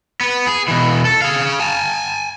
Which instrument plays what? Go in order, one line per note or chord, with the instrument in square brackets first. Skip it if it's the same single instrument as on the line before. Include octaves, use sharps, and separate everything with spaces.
[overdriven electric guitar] B3 B4
G#4
B2 E3
A4
G#4 F5
G#5 A5